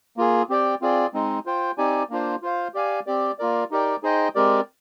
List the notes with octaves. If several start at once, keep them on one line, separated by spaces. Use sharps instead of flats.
A#3 F4 G#4
C4 G4 D5 G5
C4 F4 G#4 D5
G#3 C4 D#4
F4 C5 G5
C4 D#4 G4 D5 G#5
A#3 D4 F4 C5
F4 C5 F5
G4 D5 F5 G#5
C4 G4 D5
A#3 F4 A#4 D5
D#4 G4 A#4 D5 G5
D#4 G#4 C5 D#5 G5
G#3 C4 G4 A#4 D5